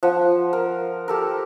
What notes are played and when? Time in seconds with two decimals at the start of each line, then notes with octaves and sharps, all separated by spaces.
0.03 F3 F#5
0.53 A#4
1.08 G4 A4 A#4